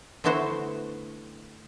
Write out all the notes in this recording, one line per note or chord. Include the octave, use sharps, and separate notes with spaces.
D3 A3 B3 E4 F#4 C5